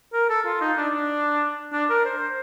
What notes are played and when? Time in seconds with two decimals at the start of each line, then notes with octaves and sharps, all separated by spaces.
0.14 A#4
0.30 A4
0.46 F4
0.61 D#4
0.78 D4
0.94 D4
1.73 D4
1.90 A#4
2.05 C5